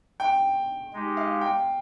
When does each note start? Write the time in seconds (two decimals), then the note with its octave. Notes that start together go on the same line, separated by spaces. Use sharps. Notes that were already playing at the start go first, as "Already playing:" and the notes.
0.20 G5
0.93 G#3 D#4 G4
1.17 F5
1.41 G5